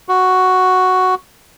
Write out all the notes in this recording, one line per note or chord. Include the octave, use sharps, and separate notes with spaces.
F#4